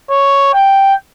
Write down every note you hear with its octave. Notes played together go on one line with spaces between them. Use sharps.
C#5
G5